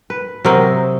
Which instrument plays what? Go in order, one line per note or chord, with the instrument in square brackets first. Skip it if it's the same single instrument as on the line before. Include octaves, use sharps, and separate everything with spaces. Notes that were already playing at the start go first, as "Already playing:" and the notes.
[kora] B4
[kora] C3 A#4 D#5 [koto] F#3 C4